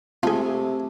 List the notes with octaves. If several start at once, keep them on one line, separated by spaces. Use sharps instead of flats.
C3 A3 F4 G#4